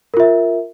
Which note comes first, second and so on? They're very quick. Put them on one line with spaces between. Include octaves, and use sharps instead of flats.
A#4 F4 E5